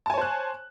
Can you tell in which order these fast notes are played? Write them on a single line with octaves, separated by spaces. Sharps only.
A5 G#5 C#5 C5 F#6